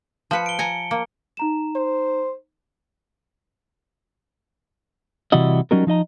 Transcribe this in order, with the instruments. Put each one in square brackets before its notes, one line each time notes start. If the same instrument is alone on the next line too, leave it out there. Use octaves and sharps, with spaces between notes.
[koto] F3 B4 [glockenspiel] A5 C#7
[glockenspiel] D7 G7
[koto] G#5 A#5 [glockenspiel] C#7
[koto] A#3
[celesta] D#4 A#5 E7
[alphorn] C5
[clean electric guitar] C3 E3 G3 E4 F#4 D#5
F#3 G3 C#4 D#4 F#4 A#4
F3 D#4 D#5 A#5